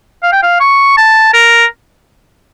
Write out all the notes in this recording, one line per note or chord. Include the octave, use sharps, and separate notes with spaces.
F5
G5
F5
C#6
A5
A#4